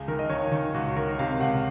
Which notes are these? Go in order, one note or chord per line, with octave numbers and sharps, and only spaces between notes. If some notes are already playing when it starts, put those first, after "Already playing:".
Already playing: C#2 G#4
D#3 A#4
D#5
D#3 C#5
D#3
C#2 F#4
D#3 A#4
C3 F5
C#2 F#5